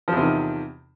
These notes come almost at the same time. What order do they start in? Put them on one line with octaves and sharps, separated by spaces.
F3 E2 C3 D#3